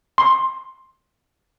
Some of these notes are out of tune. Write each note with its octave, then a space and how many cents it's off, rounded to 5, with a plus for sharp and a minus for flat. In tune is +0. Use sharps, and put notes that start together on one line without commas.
C6 +10